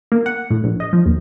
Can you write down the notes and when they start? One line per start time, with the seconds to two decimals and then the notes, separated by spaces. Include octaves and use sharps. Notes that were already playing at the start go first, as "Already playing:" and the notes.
0.12 A#3
0.26 F#5
0.50 A2
0.64 A#1
0.80 D#5
0.93 F3
1.06 D#2